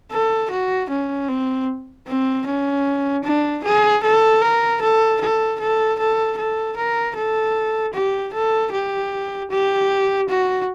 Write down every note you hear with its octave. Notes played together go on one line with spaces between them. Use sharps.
A4
F#4
C#4
C4
C4
C#4
D4
G#4
A4
A#4
A4
A4
A4
A4
A4
A#4
A4
G4
A4
G4
G4
F#4